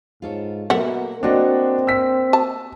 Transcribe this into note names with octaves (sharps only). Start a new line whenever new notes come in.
G#2 F4 A4 C#5
B2 F#3 A#3 A4 E5 F#5
A#3 C4 D4 F#4 C#5 D#5
E6 B6
A5